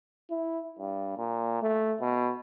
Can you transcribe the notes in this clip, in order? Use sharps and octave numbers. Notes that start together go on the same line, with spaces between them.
E4
G2
A#2
A3
B2